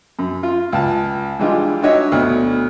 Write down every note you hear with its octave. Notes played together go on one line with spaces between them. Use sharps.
F#2
F4
C#2 A5
E3 G3 G#3 D4 F4
D4 D#4 F#4 C#5 D#5 E5
D2 B2